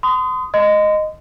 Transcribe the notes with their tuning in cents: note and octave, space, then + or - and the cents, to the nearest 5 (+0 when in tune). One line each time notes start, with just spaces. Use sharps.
C6 -40 D#6 +0
D#5 -5 C6 -35